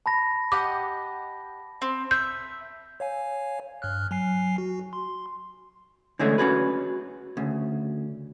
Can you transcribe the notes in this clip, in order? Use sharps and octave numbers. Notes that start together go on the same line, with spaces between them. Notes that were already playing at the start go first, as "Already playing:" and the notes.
A5 B5 A#6
G4 D#5 F#5 D6
C4
E5 G6
C#5 F5 G#5
G2 F6 F#6
F#3 G#5 C7
F#4
C6
D3 E3 G#3 A3 C#4 G#4
C#4 F#4 G#4 B4
D2 C#3